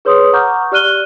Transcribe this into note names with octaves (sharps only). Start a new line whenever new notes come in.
G#4 B4 C#5 C6 D#6
F#5 A#5 C#6 D6 F6 G6
G4 D5 F6 F#6 D#7 G7